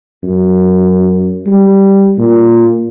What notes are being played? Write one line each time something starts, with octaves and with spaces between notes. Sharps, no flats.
F#2
G3
A#2